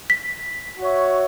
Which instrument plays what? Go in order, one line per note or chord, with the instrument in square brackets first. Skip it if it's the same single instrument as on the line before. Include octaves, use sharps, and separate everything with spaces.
[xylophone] B6
[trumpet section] F#4 C#5 E5